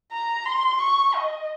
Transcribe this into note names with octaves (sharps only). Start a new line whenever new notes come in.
A#5
C6
C#6
D#5